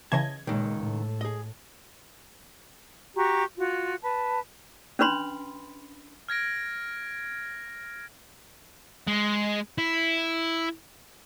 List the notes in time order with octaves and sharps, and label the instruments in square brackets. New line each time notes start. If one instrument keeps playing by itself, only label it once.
[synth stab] C#3 E3 G#6 [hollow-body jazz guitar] D#5 A5
[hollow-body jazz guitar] C#2 D#3 [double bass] A#2 G#3
[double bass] A2
[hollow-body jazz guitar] G#4 D#5
[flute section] F#4 G4 A#5 C#6
F4 F#4
B4 A5
[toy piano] C#4 D4 B4 B5 C6
[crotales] F6 G#6 A#6 D7
[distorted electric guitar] G#3
E4